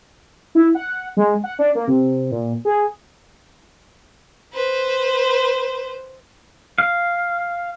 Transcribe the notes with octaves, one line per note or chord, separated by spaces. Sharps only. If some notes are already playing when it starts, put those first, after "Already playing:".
E4
F#5
G#3
F#5
D4
A#3
C3
A#2
G#4
B4 C5
F5